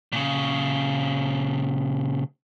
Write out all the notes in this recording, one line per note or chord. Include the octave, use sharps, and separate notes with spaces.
A#2 C#3